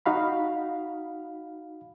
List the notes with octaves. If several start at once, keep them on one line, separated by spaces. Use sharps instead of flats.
D#4 F#4 F5 B5